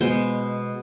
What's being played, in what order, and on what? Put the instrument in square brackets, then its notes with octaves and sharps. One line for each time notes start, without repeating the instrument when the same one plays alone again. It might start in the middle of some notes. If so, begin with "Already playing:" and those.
[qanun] B2 G#3 B3 C5